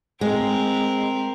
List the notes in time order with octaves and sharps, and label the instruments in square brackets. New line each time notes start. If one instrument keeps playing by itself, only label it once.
[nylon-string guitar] G#3 [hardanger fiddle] C4 A#4